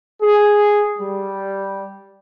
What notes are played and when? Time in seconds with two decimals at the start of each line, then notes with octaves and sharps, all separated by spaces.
0.21 G#4
0.99 G3